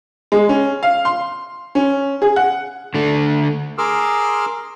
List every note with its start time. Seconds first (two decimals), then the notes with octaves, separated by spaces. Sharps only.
0.32 G#3
0.49 C#4
0.83 F5
1.05 C6
1.75 C#4
2.22 G#4
2.36 F#5
2.94 D3 A3
3.78 G#4 A#4 C6 D6 E6 F6